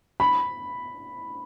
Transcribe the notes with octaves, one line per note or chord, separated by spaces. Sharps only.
B5